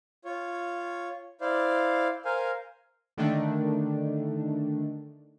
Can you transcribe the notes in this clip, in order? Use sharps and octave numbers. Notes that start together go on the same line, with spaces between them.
F4 C#5
E4 C5 D5 F5
A#4 C5 F5 G#5
D3 D#3 A3 D4